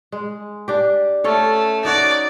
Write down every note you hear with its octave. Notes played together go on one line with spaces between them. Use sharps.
G#3
D4 G4
A3 C#4 A4 C#5
D#4 F#4 C#5 D5